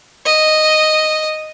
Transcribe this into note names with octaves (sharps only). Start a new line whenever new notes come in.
D#5